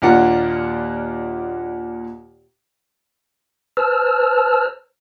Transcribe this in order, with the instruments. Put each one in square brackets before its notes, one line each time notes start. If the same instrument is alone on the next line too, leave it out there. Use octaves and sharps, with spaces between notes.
[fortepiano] D#2 A#2 A#3 D4 F4 F#5
[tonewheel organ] B4 C5 A5 E6 F6